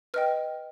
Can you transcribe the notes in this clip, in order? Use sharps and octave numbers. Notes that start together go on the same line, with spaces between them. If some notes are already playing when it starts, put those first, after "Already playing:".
B4 D#5 G5 F6